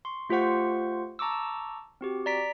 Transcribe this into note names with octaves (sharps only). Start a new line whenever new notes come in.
C6 C#6
A3 F4 G4 C5 F#5 C#6
A5 A#5 C#6 D6 E6
C4 F#4 G4
D5 A#5 B6 D7